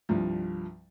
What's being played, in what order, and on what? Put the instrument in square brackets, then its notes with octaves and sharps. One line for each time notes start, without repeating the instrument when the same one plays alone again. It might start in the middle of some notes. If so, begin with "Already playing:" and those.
[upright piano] C2 G2 F3